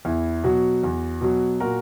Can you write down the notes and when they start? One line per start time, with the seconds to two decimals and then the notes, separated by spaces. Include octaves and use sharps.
0.05 E2 E4
0.44 B2 F#3 F#4
0.83 E2
1.21 B2 F#3
1.60 A#2 F#4 A#4